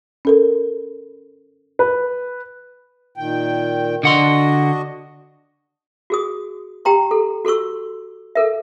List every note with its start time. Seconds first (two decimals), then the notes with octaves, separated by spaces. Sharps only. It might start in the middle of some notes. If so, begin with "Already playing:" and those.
0.25 C#4 A4 A#4
1.79 B4
3.17 A#2 D#3 G5
4.03 D3 D4 F#4 D#5 F#5 C6
6.10 F#4 G#4 D#6
6.85 G4 G5 A#5 C6
7.11 A4
7.45 F#4 A4 C6 C#6 E6
8.35 A4 A#4 E5